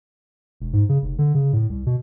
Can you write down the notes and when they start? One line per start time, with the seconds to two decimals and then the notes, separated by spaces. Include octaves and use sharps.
0.60 E1
0.73 G#2
0.89 C#3
1.02 F1
1.18 D3
1.34 C#3
1.53 A2
1.70 C2
1.86 B2